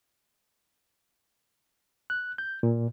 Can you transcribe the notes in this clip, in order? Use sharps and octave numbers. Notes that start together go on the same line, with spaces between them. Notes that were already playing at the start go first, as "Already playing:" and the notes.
F#6
G6
A#2